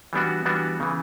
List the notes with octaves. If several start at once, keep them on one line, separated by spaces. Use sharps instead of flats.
E3 G3 B3 D4 F#4
E3 G3 B3 D4 F#4
C#3 E3